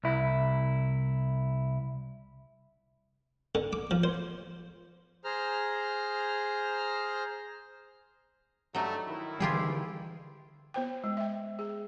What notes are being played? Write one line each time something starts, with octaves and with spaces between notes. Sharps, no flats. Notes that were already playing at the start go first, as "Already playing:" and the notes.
C2 E4
D3
D6
F3
C5
G#4 C5 A#5 F6
G2 F#3 G3 A3 D#4
D#3 E4
D3 E3 G3 F4 G4 G#4
B3 C5 G5
G#3
E5 G5
G#4